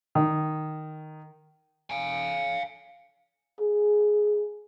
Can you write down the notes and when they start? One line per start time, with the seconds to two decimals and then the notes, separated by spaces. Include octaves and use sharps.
0.15 D#3
1.90 F5 G#5
3.60 G#4